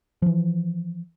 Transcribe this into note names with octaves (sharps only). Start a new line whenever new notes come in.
E3 F3